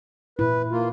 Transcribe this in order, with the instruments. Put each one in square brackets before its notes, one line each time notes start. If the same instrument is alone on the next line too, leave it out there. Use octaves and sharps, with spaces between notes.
[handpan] A#2 E4 [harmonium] B4
[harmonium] A#3 F4